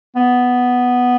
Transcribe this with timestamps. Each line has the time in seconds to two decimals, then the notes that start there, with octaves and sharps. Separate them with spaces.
0.16 B3